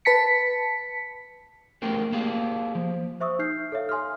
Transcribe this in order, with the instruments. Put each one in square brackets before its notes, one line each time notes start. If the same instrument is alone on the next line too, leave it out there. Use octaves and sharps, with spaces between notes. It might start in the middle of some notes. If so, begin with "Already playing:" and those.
[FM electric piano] B4 A5 B6 C#7
[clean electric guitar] A3 B3 C#4 G4 G#4 A#4
A#3 G4 G#4 F5
F3
[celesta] C5 E5 C#6 D#6 E6
D#4 F6 G6 C7
A4 C#5 E5 F5
G#5 C6 D#6 F6